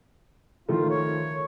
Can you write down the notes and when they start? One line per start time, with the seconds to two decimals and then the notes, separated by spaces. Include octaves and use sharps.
0.69 D#3 F3 A3 F4
0.90 C#5